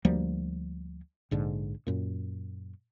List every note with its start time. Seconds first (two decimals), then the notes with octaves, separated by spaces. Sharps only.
0.05 D2 F3 G3 A#3
1.31 A#1 G#2 D3
1.87 F#2 A#2